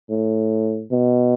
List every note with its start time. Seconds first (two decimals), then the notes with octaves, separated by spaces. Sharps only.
0.10 A2
0.91 B2